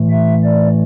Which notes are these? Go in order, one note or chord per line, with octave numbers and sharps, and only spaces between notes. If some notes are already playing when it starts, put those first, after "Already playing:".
Already playing: A2 E3 A3
E5
D5